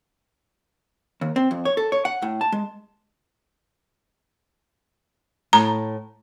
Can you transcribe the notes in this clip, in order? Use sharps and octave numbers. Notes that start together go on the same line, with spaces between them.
D#2
C4
F2
C#5
A4
C#5
F#5
A2
A5
G#3
A2 A5 A#5